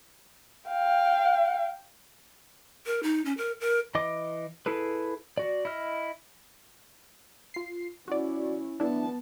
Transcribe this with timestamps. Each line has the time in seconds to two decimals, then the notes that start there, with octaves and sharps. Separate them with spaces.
0.69 F5 G5
2.86 A#4
3.03 D#4
3.25 C#4
3.38 A#4
3.60 A#4
3.95 E3 D#5 D6
4.66 E4 G#4 A4 B4
5.38 F#4 D5
5.65 E4 D#5 F6
7.54 F4 C7
8.08 C#4 E4 F#4 D5
8.80 B3 D4 E4 A5